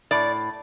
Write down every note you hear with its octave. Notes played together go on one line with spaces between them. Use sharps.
A2 D5